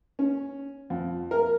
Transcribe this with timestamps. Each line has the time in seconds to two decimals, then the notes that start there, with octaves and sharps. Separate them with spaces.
0.19 C#4
0.90 F2
1.31 A#4